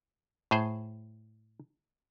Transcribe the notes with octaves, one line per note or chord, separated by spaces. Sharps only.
A2 G#4 C5